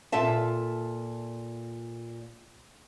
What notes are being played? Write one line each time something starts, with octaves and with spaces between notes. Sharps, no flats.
A#2 F4 A4 E5 A5